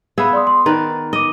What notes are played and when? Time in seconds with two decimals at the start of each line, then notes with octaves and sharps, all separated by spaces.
0.18 B3 G#4 E5 F5 B5
0.33 D5 C6 D#6
0.47 C6
0.66 D#3 B4 D5 A#5
1.13 D#5 D6 D#7